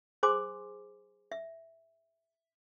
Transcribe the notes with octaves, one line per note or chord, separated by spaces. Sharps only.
G#4 C5 G#5 C6 D6
E5